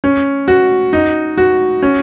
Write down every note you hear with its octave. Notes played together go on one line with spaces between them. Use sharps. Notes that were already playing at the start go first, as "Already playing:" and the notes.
C#4
F#4
D#4
F#4
C#4